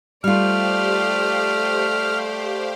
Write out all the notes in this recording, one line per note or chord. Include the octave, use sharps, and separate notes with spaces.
G3 A3 F4 G4 C5 D5 F5 F6